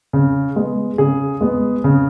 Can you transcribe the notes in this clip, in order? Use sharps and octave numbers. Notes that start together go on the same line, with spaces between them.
C#3
G#3 B3
C#3 G#4
G#3 B3
C#3